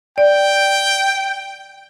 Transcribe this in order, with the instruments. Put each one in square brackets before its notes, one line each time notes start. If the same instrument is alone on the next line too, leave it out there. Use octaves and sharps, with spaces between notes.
[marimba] D5 [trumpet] G5